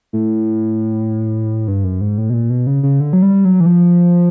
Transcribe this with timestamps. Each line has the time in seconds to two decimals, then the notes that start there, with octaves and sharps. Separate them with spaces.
0.13 A2
1.68 G2
1.84 F#2
2.01 G#2
2.18 A2
2.30 B2
2.33 A#2
2.50 B2
2.67 C#3
2.83 C#3
3.00 D3
3.13 F#3
3.22 G3
3.45 F#3
3.60 E3
3.66 F3